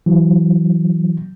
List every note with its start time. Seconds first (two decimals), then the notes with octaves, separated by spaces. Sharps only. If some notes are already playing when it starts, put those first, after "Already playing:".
0.06 E3 F#3